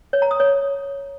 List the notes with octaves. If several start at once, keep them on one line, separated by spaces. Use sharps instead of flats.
C#5
A#5
D#6
C#5